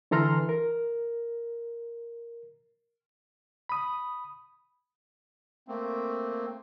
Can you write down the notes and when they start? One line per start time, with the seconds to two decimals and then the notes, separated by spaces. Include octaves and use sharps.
0.11 D3 E3 A4 A#5 C6 F6
0.49 A#4
3.69 B5 D#6
5.68 A3 A#3 C4